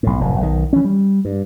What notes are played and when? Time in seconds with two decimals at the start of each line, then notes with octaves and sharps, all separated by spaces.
0.03 B1 A2
0.20 F1 F#2 A2
0.40 B1 D#3
0.73 E3 C#4
0.85 G3
1.25 G2